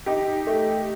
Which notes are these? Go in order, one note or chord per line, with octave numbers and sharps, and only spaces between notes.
D#4 G4
A3